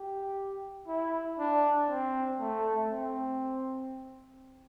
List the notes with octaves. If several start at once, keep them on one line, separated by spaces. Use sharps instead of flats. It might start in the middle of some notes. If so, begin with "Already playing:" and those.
Already playing: G4
E4
D4
C4
A3
C4